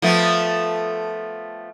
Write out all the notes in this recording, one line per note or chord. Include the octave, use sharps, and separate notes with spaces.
F3 A3 B3